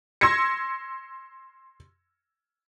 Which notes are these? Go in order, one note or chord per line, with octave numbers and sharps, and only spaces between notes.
C6 E6 G#6 A#6 C#7